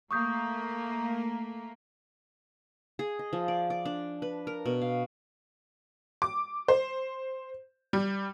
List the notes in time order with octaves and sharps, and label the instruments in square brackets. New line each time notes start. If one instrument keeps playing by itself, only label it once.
[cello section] A3 A#3 [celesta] C#6 D#6 G6
[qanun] G#4
D#5
F3
D5
D5
D4
B4
A#4
B2
F5
[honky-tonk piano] D6
C5
G3